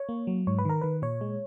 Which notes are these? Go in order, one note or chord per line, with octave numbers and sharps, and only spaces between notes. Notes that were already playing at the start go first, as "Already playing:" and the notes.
Already playing: C#5
A#3
F#3
G#2 C#5
B4
D#3 A#4
D#3 B4
A#2 C#5
G#3